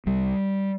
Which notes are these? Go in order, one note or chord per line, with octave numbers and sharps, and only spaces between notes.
C2 G3